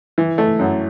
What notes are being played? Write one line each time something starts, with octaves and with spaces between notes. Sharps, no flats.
E3
A3
F#2